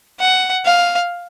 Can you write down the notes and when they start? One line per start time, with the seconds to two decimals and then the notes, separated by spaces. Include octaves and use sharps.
0.20 F#5
0.66 F5